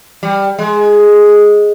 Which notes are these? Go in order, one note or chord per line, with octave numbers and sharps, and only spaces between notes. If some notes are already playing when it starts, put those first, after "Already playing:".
G3
G#3